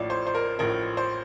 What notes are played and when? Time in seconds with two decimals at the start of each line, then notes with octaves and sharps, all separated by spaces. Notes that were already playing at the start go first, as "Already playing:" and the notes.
Already playing: A1 A2 F3 D5
0.10 C5
0.27 C5
0.35 A#4
0.59 A1 A2 F3 A#4
0.97 C5